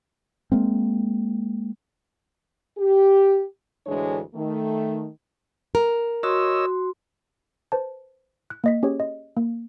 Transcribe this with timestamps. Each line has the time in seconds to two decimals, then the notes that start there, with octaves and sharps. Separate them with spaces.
0.52 G#3 A#3 C4
2.78 G4
3.87 D2 A2 E3 G#3 D4 C#5
4.35 D#3 A3
5.75 A#4
6.23 F#4 C#5 D#5 C6 E6
7.72 B4 C5 A5
8.50 F#6
8.64 A#3 D#5 B6
8.83 C#4 G4 G#4 C#5
9.00 D#5
9.37 A#3